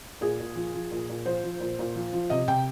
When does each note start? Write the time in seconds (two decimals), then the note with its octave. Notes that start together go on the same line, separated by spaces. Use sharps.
0.21 A#2 G#4
0.40 A#2
0.56 F3
0.74 F3
0.91 A#2
1.09 A#2
1.26 F3 C5
1.43 F3
1.60 A#2
1.79 A#2
1.95 F3
2.13 F3
2.30 C3 D#5
2.48 C3 G5